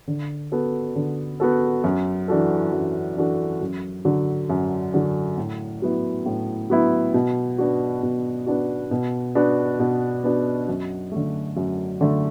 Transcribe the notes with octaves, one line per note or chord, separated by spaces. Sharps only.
D3
B3 F#4 A4
D3
B3 F#4 A4
F#2
E3 D4 F#4 A4
F#2
E3 D4 F#4 A4
F#2
D3 F#3
F#2
D3 F#3
A2
F#3 B3 E4
A2
F#3 B3 E4
B2
B3 D4 F#4
B2
B3 D4 F#4
B2
B3 D4 F#4
B2
B3 D4 F#4
F#2
D3 A3
F#2
D3 A3